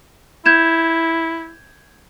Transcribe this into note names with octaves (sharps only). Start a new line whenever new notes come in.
E4 G6 G#6 E7